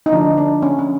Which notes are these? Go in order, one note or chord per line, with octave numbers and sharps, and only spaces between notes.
D#4
D3 F3 A3 D4
D4
C#4
C#4